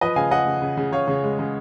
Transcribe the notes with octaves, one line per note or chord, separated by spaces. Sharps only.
F3 B4 D#5
C#3 F5 G#5
C#3 D#5 F#5
C#3
C#3
C#3
C#3 C#5 F5
C#3
G#3
C#3